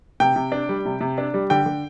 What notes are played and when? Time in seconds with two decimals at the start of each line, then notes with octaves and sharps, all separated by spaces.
0.20 C3 G5
0.36 C3
0.52 D4
0.69 G3
0.86 C3
1.01 C3
1.18 D4
1.34 G3
1.50 D3 G5
1.66 D3